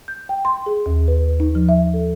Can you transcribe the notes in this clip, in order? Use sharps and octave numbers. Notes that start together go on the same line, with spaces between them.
G6
G5
C6
G#4
D#2
B4
D#4
F3
E5
A4